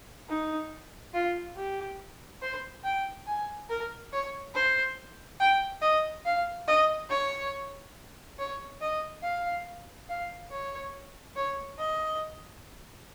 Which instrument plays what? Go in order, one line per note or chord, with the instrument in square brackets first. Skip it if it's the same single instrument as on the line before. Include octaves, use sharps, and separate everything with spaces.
[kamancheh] D#4
F4
G4
C5
G5
G#5
A#4
C#5
C5
G5
D#5
F5
D#5
C#5
C#5
D#5
F5
F5
C#5
C#5
D#5